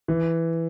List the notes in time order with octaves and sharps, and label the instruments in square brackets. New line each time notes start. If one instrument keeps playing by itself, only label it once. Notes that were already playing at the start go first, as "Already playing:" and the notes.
[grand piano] E3